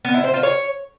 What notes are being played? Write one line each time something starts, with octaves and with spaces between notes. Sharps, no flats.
B3
E4
C5
F4
C#5